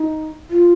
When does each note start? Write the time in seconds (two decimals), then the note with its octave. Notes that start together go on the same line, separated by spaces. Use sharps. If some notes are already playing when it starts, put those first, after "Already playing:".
Already playing: D#4
0.50 F4